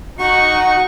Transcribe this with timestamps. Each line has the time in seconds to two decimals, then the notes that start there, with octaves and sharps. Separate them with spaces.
0.19 D#4 F#4 F#5 C#6